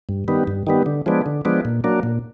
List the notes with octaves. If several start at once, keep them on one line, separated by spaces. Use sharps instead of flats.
G2
D#3 G3 B3
G2
D#3 G3 B3
D3
F3 G#3 B3 D4
D3
F3 G#3 B3 D4
A#2
F#3 A#3 D4
A#2